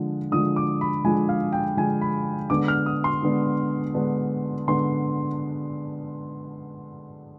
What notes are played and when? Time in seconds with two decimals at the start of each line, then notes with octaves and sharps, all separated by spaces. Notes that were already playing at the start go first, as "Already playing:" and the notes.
Already playing: D3 F3 G#3
0.32 D3 F3 G#3 D#6
0.56 D6
0.81 B5
1.05 D3 F3 G#3 G#5
1.29 F5
1.53 G5
1.77 D3 F3 G#3 G#5
2.01 B5
2.50 D3 G#3 B3 D4 D6
2.68 F6
2.86 D#6
3.04 C6
3.23 D3 G#3 B3 D4
3.95 D3 G#3 B3 D4
4.68 D3 G#3 B3 C6